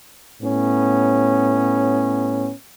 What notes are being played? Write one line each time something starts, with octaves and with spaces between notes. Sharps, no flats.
A2 B3 C#4